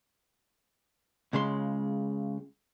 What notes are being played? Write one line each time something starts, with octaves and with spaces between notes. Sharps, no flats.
C#2 C#3 G#3 C6